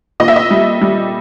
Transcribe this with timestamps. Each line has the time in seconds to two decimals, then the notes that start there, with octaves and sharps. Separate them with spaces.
0.20 A#2 D#5
0.28 E5
0.36 D#5
0.51 G3
0.81 G3